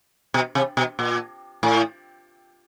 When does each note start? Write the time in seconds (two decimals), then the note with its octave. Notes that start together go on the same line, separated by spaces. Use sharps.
0.34 B2
0.55 C3
0.77 B2
0.99 A#2
1.63 A2